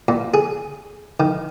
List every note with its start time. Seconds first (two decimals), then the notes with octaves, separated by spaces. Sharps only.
0.08 A#2
0.34 G#4
1.20 D#3